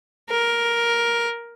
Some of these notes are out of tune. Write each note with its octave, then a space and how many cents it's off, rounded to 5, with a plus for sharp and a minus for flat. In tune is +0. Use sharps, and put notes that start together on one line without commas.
A#4 +10